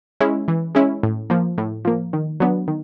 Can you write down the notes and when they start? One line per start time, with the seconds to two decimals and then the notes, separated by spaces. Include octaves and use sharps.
0.21 G#3 C#4 E4
0.48 E3
0.75 G#3 C#4 E4
1.03 A2
1.30 F3 A#3
1.58 A2
1.85 F3 A#3
2.13 D#3
2.40 F#3 B3 D4
2.68 D#3